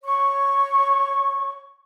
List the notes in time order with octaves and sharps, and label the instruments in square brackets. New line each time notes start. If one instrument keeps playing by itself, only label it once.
[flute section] C#5 C#6